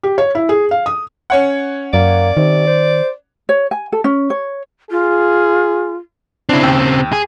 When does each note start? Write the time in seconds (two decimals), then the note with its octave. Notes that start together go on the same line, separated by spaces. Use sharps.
0.03 G4
0.18 C#5
0.35 E4
0.49 G#4
0.71 F5
0.86 D#6
1.30 C#4 C#5 F#5
1.94 F#2 A#3 D5
2.37 C3 D#3
2.67 C5
3.49 C#5
3.71 G#5
3.92 A4
4.04 C#4
4.30 C#5
4.91 F4 G#4
6.49 C#3 C4 D4 E4
6.63 D#2 G5 E6
7.13 G#4